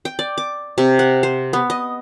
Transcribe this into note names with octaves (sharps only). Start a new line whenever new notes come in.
G5
D5
D6
C3
F#5
C5
B3
D#5